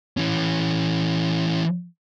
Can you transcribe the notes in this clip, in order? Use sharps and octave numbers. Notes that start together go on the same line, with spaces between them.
E3 C#4